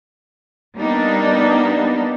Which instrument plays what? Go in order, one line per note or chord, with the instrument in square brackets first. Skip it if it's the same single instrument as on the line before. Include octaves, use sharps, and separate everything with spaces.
[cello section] G3 A#3 B3 D4 D#4